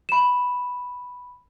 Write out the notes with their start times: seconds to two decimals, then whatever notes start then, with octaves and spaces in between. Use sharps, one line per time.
0.09 B5 E7